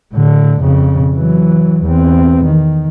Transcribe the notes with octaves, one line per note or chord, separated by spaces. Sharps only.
A2 D3
F2 C#3
E3 F#3
E2 C4
D#3